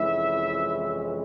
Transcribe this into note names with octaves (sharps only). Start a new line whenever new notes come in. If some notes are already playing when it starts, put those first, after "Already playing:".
Already playing: F2 C3 E3 G#3 C#4 E4 E5